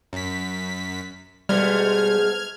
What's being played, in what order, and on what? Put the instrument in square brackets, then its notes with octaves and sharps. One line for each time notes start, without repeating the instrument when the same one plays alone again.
[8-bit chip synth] F#2 B6
[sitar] G#2 B2 A3 [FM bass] G3 [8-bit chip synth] F6 G#6